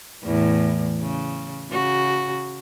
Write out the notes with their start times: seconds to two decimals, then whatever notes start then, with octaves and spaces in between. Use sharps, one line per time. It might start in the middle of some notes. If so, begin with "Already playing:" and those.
0.23 E2 A2
0.99 C#3
1.72 C#3 F#4